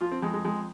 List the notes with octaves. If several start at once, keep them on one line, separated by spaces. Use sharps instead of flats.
F3 F4
C4
F2 G#3
G#3
F2 G#3